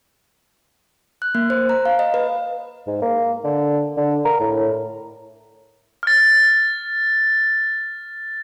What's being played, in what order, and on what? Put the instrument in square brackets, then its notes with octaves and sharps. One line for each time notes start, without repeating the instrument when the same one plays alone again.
[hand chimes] F#6
A#3
C5
A#5
F5
D#5
B4
[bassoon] G#2
A#3
D3
D3
A#4
A2
[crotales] F6 A6